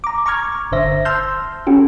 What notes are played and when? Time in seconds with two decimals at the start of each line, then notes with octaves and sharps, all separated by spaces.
0.04 A#5 D6
0.26 A#5 C#6 D6 F6 G#6
0.72 G1 D3 C5 E5 A#6
1.05 A5 C6 E6 F6 G6
1.67 C#4 F#4 G4 A4